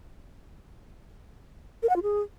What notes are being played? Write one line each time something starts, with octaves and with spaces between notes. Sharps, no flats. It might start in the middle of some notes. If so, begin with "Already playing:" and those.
A#4
F#5
F4
G#4